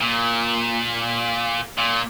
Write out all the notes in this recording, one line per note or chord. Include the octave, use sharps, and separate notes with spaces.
A#2
A#2